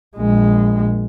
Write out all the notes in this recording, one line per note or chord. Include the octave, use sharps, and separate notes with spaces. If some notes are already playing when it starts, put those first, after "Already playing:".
A#1 G#3